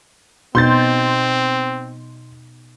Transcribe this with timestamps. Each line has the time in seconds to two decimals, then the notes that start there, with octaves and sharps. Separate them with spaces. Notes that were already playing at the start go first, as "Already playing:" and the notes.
0.55 B2 C4 D#4 C6 G6 A6